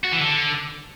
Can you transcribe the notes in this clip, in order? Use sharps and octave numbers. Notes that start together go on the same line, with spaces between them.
F#4
E3
D3